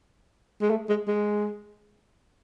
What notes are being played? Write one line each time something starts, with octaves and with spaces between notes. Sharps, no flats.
G#3
A3
G#3
G#3